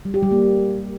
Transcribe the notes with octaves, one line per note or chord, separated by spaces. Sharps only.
G3
G4
G3
A#3